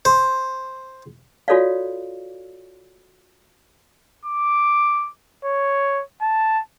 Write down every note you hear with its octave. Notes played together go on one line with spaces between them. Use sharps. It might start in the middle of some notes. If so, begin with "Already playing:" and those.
C5
F4 F#4 A4 C#5 D5 F5
D6
C#5
A5